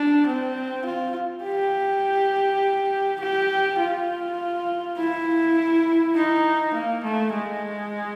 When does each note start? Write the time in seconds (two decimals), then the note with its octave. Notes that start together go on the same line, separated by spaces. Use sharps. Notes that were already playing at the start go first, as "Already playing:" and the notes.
Already playing: D4
0.27 C4
0.85 F4
1.44 G4
3.21 G4
3.80 F4
4.98 E4
6.16 D#4
6.74 A#3
7.04 A3
7.33 G#3